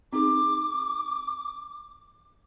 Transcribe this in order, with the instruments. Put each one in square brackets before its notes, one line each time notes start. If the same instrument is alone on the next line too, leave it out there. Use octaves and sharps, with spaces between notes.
[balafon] C4 D#4 G#4 [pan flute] D6